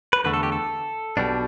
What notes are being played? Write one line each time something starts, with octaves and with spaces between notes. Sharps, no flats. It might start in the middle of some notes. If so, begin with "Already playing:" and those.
B4
E2 D3 A3 B4
A4
G4
A4
B1 B2 G3 D4